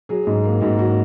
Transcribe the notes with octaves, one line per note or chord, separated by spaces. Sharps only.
F#3 G#4
G#2
A#3
G#2 F#4
F#3 F#4